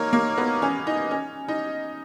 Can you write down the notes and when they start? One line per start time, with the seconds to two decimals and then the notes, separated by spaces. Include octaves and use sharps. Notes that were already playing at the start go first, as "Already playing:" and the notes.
Already playing: A#3 D#4 A#4 C#5
0.13 A#3
0.38 B3
0.62 C#4
0.87 D#4
1.11 C#4
1.48 D#4